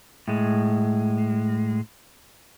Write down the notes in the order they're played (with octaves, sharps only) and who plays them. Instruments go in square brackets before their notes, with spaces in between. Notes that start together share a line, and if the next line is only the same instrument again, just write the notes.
[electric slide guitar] A2 G#3